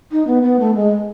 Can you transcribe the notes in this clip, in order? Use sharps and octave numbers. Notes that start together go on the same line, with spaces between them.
D#4
B3
B3
A3
G#3